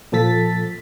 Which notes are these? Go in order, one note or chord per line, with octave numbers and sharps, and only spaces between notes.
A#2 F3 A4 A6 B6